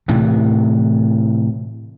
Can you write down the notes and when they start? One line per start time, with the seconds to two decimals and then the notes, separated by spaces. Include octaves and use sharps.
0.08 A2 C3 E3